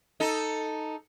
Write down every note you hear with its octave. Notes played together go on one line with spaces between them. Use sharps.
D#4 A4